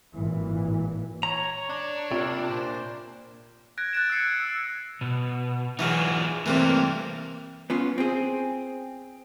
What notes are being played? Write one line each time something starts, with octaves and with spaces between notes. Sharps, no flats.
G#1 A#2 E3
C#5 A#5
D4
C3 A#3 F4
A#2 C5 D5
F#6 G#6 A#6 D7
F#6 A6 D7 E7
E6 G#6 C7 C#7
E6
E6
B2
E3 F#3 D#4 F4 G#4
G2 C3 E3 A3 A#3
B3 C#4 F4
C4 G#4